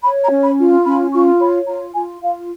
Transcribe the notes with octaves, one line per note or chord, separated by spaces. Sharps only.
C#5 B5
A#5
C#4
B5
F4
C#4 B5
F4 C#6
C#5 B5
F4 A#5
F4 G#5
F4 F5